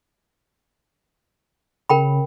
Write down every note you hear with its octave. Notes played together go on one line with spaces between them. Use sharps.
C#3 A#4 G5 B5